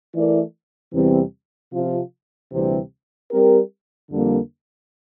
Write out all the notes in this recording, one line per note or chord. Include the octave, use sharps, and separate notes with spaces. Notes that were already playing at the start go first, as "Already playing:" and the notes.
E3 A3 E4 A#4 D5
E2 C3 E3 G3 C4
C3 F3 C4 F4
D2 C3 E3 G3 C4
G3 C4 G4 A#4
F2 D3 G3 A#3